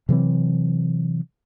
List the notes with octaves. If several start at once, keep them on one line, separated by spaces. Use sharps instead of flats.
C3 E3 F#3 C4